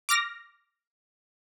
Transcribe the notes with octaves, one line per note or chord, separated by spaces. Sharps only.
D6 F6 A#6